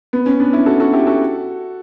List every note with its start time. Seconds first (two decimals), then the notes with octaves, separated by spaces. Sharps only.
0.13 B3
0.26 C#4
0.40 B3 D4
0.53 C#4 E4
0.66 F#4 A4
0.80 F#4 A4
0.93 E4 G4
1.07 F#4 A4